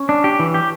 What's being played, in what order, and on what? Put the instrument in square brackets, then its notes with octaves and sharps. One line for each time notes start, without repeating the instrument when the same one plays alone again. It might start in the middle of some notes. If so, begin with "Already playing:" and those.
Already playing: [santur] C#4
[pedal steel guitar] D4
G4
E3
G4